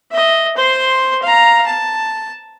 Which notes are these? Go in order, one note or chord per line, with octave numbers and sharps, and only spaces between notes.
D#5 E5
C5 C6
F5 A#5
A5